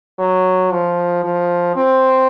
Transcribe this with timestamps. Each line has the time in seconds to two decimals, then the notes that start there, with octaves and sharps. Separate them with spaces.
0.19 F#3
0.71 F3
1.24 F3
1.76 C4